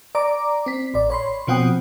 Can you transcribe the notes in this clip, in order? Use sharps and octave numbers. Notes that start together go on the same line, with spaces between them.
D5 A#5 D6
C4 B6
A1 D5
C#5 B5 C6
B2 F3 C4 F#5 G5 D#6